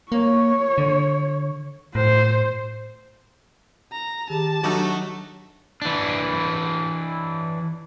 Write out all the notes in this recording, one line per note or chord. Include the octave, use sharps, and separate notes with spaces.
A#3 C#5
D3
A2 C5
A#5
D#3 G4 G#4 A5
F#3 A3 D4 D#4 F#4 D6
E3 D4